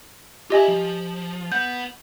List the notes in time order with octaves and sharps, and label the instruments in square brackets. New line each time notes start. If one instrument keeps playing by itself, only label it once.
[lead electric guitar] F4 E5 [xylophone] G4 D#5 G#5
[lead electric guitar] F3
[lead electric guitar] B3 F#5 [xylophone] G6